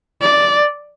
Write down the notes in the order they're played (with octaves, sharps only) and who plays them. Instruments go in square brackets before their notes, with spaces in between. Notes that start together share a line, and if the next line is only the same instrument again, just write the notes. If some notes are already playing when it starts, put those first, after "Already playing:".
[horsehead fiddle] D5